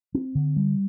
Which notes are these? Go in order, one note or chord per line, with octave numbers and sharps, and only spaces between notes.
C4
D3
G3